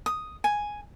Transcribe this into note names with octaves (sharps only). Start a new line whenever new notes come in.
D#6
G#5